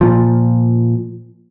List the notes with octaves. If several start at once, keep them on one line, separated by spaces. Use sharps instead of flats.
A#2 F3